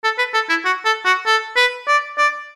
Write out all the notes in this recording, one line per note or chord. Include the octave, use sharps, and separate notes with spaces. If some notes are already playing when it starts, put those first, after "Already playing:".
A4
B4
A4
E4
F#4
A4
F#4
A4
B4
D5
D5